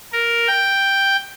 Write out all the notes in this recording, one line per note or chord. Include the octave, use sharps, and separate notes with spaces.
A#4
G5